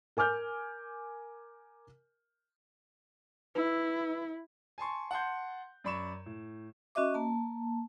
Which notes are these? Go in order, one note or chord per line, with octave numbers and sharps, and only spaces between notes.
A#4 G#5 D6 F6 G6
E4 B4 E6
G#5 A5 C6 C#6
F#5 A5 C6 G6
F#2 D5 B5 C#6 E7
A2
C#4 F#4 D#5 E5 D6
A#3 A5